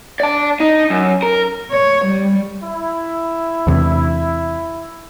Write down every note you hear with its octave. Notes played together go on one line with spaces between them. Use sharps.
D5 A5
D#4
F#2
A#4
C#5
G3
E4
E2 C3